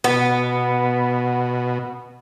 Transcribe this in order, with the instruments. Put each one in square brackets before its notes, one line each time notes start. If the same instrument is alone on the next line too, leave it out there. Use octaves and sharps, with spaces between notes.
[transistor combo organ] B2 [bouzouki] B3